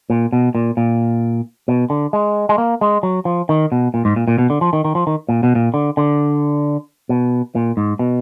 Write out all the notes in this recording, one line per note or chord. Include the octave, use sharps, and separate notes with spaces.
A#2
B2
A#2
A#2
B2
D3
G#3
G#3
A#3
G#3
F#3
F3
D#3
B2
A#2
G#2
A#2
A#2
B2
D3
F3
D#3
D#3
F3
D#3
A#2
B2
A#2
D3
D3
B2
A#2
G#2
B2